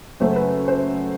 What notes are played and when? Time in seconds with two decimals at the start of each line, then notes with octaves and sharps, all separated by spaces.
0.20 F#2 C#3 F#3 A3 C5
0.36 B4
0.68 C5